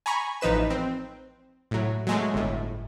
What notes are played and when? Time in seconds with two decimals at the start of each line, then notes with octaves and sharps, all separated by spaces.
0.06 G#5 A#5 B5 C#6
0.41 A1 F3 D#4 B4 E7
0.70 C4
1.71 A2 F#3
2.07 F#3 G#3 A3
2.34 G1 A2